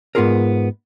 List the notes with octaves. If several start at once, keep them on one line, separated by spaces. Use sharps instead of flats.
G#2 B3 C#4 F4 G#4 A#4